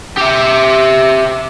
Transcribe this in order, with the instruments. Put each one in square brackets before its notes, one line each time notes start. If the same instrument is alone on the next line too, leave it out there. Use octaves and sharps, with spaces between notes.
[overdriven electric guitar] G4 E5